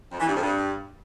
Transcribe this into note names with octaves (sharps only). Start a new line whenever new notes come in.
F2
E3
G2
F2
G2